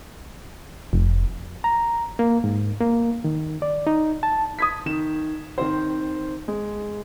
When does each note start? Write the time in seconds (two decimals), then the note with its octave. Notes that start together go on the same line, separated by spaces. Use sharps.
0.93 F1
1.64 A#5
2.19 A#3
2.44 G#2
2.80 A#3
3.24 D#3
3.62 D5
3.87 D#4
4.23 A5
4.59 D#6 G#6 B6
4.86 D#3 E7
5.58 D#3 C4 C5
6.48 G#3